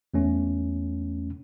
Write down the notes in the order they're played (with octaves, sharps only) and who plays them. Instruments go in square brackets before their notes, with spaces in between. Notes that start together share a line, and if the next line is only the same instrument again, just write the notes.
[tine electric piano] E2 A3 C#4